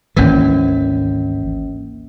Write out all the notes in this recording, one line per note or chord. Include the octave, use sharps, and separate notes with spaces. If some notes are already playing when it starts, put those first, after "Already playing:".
G#1 D2 E3 A#3 C#4